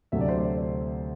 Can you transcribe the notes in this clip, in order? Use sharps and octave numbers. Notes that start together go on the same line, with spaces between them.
D2 C3 F#3 A3 E5
D5
C5
D5